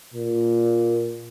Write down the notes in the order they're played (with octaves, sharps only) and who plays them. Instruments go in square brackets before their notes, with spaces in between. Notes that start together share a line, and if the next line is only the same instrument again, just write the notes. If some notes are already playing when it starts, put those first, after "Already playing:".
[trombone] A#2